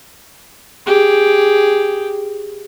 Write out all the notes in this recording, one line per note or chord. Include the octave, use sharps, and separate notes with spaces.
G4 G#4